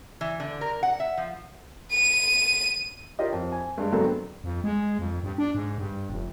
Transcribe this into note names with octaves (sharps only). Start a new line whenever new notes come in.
E3
D3
A#4
F#5
E5
F3
D#7
F4 G4 A#4 C#5 D#5
F2
G#5
G2 G#3
D3 F#3 G#3 B3 C4 A4
F2
G#3
F2
G2
D4
G#2
G2
F1